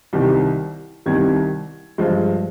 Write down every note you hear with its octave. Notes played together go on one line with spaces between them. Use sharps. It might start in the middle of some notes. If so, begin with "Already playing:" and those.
C2 C3 D#3 G3
C2 C3 D#3 G3 G#6
G2 F3 G#3